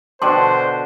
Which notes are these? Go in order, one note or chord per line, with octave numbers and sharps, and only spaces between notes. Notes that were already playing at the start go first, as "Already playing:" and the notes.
B2 D3 C5 G5 A5 C6 D6